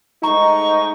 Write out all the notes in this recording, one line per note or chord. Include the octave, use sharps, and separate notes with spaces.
G#2 A3 D#4 A#5 C#6